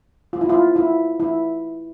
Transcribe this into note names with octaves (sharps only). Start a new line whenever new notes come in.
F4
E4
F4
E4
E4